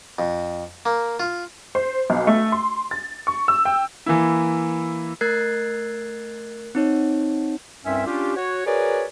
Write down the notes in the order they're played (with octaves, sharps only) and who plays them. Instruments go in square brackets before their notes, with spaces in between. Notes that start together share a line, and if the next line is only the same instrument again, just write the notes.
[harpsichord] F2
A#3
F4
[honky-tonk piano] C5
B1
A3
C6
A6
C#6
E6
G5
[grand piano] E3 A#3 E4
[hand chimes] A3 A#4 F#6 G#6 A6 C7
C4 D#4 C#5
[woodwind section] C2 G2 C4 C#4 E5
C#4 D4 F4 G4
F#4 C#5
F#4 G#4 A#4 B4 C#5 D5